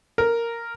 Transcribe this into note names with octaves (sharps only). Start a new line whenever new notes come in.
A#4